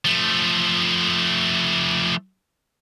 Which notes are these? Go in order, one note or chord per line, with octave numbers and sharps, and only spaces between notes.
F3 A3